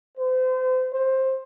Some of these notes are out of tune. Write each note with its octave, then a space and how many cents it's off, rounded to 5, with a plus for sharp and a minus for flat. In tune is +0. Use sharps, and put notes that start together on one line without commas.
C5 -35
C5 +15